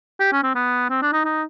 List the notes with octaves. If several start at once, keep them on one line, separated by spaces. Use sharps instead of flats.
G4
C#4
C4
B3
C4
D4
D#4
D#4